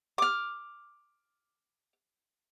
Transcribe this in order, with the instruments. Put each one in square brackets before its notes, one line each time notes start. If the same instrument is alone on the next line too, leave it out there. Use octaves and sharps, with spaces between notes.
[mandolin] D6 F6